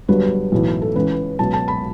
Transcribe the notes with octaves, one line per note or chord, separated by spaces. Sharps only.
G1 G2 F#3 B4
B1 A2 E3
A4
C#2 C#3 E3 B4
C#2 B2 F#3 A5
A5
B5